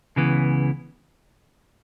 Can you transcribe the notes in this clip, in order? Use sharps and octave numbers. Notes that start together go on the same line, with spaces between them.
C#2 C#3 E3 B3